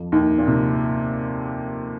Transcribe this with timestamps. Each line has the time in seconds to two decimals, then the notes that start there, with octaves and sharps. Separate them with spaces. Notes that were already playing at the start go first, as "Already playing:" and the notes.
Already playing: F2 F3
0.12 D#2 D#3
0.38 A#2
0.47 C3